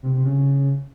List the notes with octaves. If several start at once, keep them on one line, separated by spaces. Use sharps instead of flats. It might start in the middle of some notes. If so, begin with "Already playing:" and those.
C3
C3
C#3